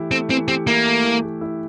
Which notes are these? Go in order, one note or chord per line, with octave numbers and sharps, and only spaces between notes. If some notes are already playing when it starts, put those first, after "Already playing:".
Already playing: E3 A3 E4 G4
A3 C4
E3 C4
C4 G4
A#3 E4
A3
E3
G4
E4